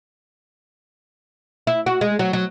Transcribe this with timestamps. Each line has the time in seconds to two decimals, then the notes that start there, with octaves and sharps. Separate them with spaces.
1.67 E4
1.86 F#4
2.01 G#3
2.19 F#3
2.33 F#3